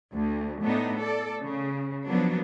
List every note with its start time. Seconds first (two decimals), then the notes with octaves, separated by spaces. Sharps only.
0.14 D2
0.62 A2 A3 B3 D4 D#4
0.98 A4 D5
1.43 C#3
2.06 F3 F#3 A#3 B3 D4